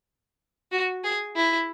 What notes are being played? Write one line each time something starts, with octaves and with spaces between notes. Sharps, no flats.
F#4
G#4
E4